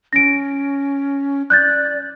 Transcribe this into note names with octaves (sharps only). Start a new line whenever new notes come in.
C#4 A#6 D7
D5 F#6 G6 A6